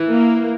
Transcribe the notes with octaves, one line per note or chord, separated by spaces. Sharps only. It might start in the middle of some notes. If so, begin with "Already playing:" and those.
Already playing: E3
A#3